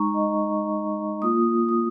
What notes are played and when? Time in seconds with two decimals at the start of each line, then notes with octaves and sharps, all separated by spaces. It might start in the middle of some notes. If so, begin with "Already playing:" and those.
Already playing: G#3 D#4 A#5 C#6
0.14 D#5
1.22 A#3 F4 D#6
1.69 D#6